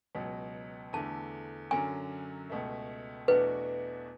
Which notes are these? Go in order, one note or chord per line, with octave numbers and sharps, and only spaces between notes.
C#2 B2 F#3
E2 D3 A3 A5
F#2 D3 F#3 C#4 G#5
C#2 B2 A3
E2 B2 A3 D4 F#4 B4